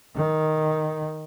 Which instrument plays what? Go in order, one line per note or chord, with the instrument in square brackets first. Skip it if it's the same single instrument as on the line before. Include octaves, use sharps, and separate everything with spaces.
[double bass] D#3